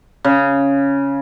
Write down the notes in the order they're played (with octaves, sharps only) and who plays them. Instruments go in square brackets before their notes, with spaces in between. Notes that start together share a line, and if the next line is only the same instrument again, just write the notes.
[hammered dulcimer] C#3